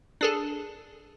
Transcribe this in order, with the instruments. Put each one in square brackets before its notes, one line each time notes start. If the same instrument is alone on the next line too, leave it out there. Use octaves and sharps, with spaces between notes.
[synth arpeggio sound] D4 G#4 A4